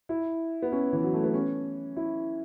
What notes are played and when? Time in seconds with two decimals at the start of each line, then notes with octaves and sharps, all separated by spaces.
0.09 E4
0.62 B3
0.72 C#4
0.93 E3
1.03 F#3
1.13 A3
1.24 B3
1.34 C#4
1.97 E4